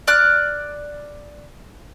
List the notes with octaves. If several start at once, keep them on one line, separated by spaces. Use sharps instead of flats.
D5 F6 F#6